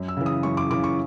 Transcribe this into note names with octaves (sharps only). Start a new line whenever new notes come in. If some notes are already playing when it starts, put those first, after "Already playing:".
Already playing: F#2
E6
C#3 E3
D#6
F#2 C#6
D6
C#3 E3 D6
C#6